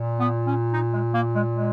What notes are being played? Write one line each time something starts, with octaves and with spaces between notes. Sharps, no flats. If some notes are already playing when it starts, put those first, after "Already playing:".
Already playing: A#2
B3
C#4
D#4
G#3
A#3
G#3
G#3